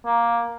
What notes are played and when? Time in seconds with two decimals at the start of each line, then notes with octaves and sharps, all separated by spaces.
0.05 A#3